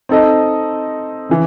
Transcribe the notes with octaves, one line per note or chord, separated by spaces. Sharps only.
C4 D#4 A4 D#5
C#3 E3